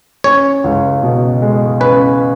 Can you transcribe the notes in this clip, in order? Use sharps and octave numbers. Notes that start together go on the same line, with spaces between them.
C#4 C#5
C#2
B2
G#3
C#4 B4